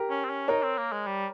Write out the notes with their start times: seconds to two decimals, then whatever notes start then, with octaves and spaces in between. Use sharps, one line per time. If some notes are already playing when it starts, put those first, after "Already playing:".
Already playing: G4 A#4
0.10 C#4
0.25 C4
0.29 C#4
0.48 D#4 A#4 C#5
0.63 C4
0.77 A#3
0.92 G#3
1.06 G3